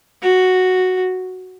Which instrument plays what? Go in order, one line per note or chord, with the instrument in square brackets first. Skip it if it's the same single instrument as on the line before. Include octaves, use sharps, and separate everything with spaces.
[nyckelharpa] F#4